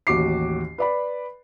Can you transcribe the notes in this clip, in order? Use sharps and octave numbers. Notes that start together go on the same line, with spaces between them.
A1 D#2 F#4 D6 C7
B4 D5 B5